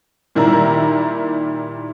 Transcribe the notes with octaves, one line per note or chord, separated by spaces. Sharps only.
A#2 D#3 G3 E4 A#5